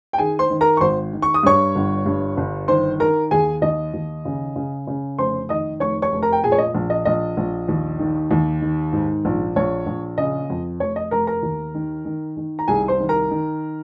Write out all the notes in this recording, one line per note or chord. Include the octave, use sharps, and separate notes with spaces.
G5
D#3 G#4 G#5
C5 C6
D#3
A#4 A#5
C#6
G#1 C5 C6
D#3
C#6
D#6
G2 C#5 C#6
G1
G2
G1
D#3 C5 C6
D#3 A#4 A#5
D#2 G#4 G#5
D#2 D#5
D#2
C#3
C#3
C#3
F1 C5 C6
D#3 D#5 D#6
F1 C#5 C#6
C#5 C#6
F1
A#4 A#5
G5
A#2 G#4 G#5
C#5
D#5
A#1
D#5
A#1 D#5
A#1
D#2
D#3
D#2
D#3
G#2
A#1
A#1 C#5
A#1
C#3 D#5
F2
F1 C#5
D#5
F1 A#4 A#5
A#4 A#5
D#2
D#3
D#3
D#3
A#5
C2 G#4 G#5
C5 C6
D#3
A#4 A#5
D#3